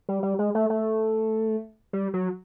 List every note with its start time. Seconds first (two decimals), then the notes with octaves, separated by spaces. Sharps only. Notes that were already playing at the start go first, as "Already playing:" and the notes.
0.09 G3
0.23 G3
0.39 G#3
0.55 A3
0.70 A3
1.93 G3
2.14 F#3